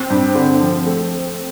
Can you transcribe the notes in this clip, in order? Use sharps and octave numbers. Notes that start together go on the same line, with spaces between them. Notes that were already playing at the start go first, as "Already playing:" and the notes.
Already playing: C4
G2
D3
F3
A3